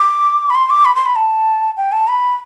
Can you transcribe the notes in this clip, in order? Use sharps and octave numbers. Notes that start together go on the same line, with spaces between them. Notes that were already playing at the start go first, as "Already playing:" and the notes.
Already playing: D6
B5
C6
D6
B5
C6
B5
A5
G5
A5
B5